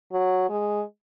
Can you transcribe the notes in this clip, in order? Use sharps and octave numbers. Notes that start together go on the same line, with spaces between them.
F#3
G#3